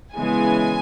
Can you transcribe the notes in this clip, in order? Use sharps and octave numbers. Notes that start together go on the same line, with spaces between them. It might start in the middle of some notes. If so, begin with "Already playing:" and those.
C#3 E3 G#3 B3 G#5